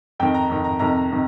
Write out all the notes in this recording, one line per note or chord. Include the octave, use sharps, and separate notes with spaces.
F2 D#3 G5
A#5
F2 D#3
A#5
F2 C3 D#3 A#5
C3 D#3